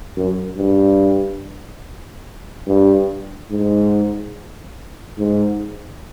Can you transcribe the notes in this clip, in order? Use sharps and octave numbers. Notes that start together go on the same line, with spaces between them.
F#2
G2
G2
G#2
G#2